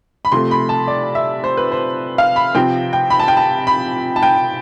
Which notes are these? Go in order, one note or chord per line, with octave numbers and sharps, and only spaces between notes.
B5
C3 F3 A3 C6
B5
A5
D5
E5
C5
B4
C5
F5
B5
C3 F3 C4 G5
G5
B5
A5
G5
A5
B5
A5
G5